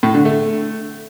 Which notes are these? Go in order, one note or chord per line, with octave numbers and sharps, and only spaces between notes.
A2
D3
A3